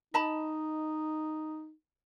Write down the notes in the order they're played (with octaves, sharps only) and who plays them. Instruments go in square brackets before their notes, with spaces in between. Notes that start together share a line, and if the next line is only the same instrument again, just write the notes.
[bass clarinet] D#4 [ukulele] D#5 A5 B5